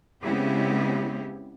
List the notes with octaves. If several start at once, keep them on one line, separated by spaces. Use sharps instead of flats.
C#3 G#3 B3 C4 E4 G4